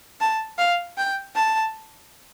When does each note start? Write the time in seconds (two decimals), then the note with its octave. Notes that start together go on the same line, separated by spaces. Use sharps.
0.21 A5
0.58 F5
0.98 G5
1.36 A5